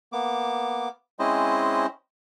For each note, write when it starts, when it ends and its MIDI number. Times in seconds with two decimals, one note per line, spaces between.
0.13 0.89 58
0.13 0.89 59
0.13 0.89 86
1.19 1.86 56
1.19 1.86 60
1.19 1.86 61
1.19 1.86 64
1.19 1.86 72
1.19 1.86 75